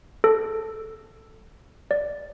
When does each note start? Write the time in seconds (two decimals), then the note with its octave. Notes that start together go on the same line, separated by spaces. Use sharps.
0.24 A4
1.91 D5